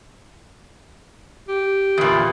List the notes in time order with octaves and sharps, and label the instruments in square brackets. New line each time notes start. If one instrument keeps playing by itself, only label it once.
[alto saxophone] G4
[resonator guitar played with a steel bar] E2 A#2